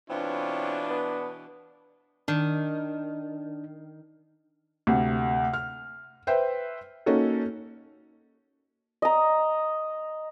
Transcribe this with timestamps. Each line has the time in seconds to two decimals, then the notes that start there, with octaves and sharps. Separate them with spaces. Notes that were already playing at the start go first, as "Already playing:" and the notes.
0.10 B2 E3 C4 D4 F4 C#5
0.90 B3
2.28 D#3 D4
4.87 D2 C3
5.53 F6
6.27 B4 C5 E5 G5
7.06 A#3 C#4 D#4 F#4 A4
9.02 D#5 A#5